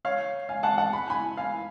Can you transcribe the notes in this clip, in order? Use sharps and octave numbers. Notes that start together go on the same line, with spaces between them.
C#5 F5
F5 G#5
F#5 A5
F#5 A5
B5
G#5 B5
F5 G#5